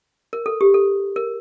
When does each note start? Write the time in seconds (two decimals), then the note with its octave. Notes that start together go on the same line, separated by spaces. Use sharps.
0.33 A#4
0.46 A4
0.61 G4
0.74 A4
1.16 A#4